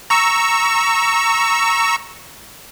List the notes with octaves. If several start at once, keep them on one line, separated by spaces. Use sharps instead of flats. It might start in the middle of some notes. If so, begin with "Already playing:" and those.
A#5 C#6 E6